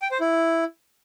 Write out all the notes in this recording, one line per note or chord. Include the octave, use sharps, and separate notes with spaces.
G5
C5
E4